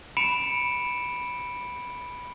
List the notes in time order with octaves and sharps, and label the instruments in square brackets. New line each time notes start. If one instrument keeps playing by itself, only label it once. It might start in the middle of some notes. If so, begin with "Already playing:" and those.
[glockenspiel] B5 C#7 D7 E7